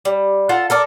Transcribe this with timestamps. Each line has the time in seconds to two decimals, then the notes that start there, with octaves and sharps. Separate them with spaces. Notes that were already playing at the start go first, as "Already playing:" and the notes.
0.05 G3
0.49 F4 A4 F#5
0.70 A4 A#4 D5